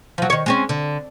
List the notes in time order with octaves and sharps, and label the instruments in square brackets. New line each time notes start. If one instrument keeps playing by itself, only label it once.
[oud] F3 F#3
D#3 C#5
G#3 C4 C#4
D3